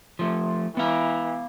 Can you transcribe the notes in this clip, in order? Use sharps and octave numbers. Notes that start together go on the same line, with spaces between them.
F3 A3
E3 B3 F5